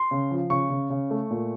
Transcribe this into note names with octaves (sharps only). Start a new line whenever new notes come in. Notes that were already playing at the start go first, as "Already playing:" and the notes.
Already playing: C6
C#3
F3
C#3 C#6
C#3
C#3
A3
A#2